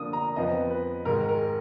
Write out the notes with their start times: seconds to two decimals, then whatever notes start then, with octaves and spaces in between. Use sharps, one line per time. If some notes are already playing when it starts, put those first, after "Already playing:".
Already playing: D3 F3 A#3 D4 D#6
0.13 A#5
0.36 F2 F3 B3 D#5
0.71 B4
1.05 G#2 D#3 G#3 A#4
1.29 A#4